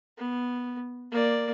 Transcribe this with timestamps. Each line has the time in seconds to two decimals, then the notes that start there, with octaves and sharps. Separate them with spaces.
0.18 B3
1.11 A#3 D5